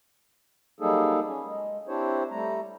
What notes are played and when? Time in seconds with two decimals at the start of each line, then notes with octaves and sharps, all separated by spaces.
0.80 F#3 G3 A#3 D#4 G#4 A4
1.27 C#4
1.45 G#3
1.87 C4 D4 E4 G4 C5 C#5
2.31 G3 A3 A#5